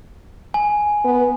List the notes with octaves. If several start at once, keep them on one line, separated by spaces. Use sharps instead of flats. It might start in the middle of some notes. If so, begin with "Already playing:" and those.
G#5
B3